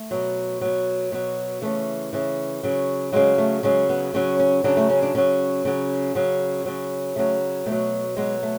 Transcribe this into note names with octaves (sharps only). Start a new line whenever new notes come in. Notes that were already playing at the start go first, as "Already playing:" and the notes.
Already playing: A3
B2 F#3
B2 F#3
B2 F#3
C#3 E3 A3
C#3 E3
C#3 F#3
C#3 F#3 G#3
A3
C#3 F#3 G#3
B3
C#3 F#3 C#4
C#4
C#3 F#3 D4
A3
C#4
D4
C#3 F#3 C#4
C#3 F#3
C#3 F#3
C#3 F#3
C#3 F#3 A3
B2 A3
F#3
B2 F#3 G#3
A3